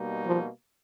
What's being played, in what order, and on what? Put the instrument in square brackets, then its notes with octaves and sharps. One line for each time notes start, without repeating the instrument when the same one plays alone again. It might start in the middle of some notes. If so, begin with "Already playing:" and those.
Already playing: [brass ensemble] B2 G3 A#3 D#4
[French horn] F3